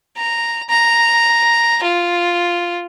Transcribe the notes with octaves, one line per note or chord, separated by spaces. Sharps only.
A#5
A#5
F4